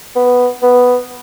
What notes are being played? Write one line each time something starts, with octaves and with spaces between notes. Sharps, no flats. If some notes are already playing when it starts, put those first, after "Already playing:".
B3
B3